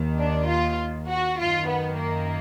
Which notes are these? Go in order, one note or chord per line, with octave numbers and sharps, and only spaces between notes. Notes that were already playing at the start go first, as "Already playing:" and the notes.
Already playing: D#2 D#3
D4
F4
F#4
F#2 D#3 F4
B3
A#3